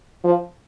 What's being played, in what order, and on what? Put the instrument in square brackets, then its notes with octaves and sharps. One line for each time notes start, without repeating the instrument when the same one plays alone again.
[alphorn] F3